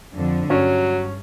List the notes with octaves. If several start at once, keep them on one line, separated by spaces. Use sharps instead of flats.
F2 D3
G2 F#3 C#4